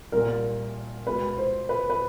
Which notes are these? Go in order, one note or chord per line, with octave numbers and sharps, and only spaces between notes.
C2 A#2 A#4
C#2 B2 B4
C5
B4
B4